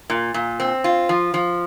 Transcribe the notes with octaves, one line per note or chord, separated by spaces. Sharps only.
A#2
A#2
C4
F4
F3
F3